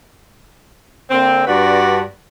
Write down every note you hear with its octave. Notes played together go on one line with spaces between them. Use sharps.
D3 A#3 C4
G2 D4 F#4 B4 D5